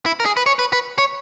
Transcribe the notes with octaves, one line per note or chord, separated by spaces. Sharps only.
E4
A#4
G#4
B4
C#5
B4
B4
C#5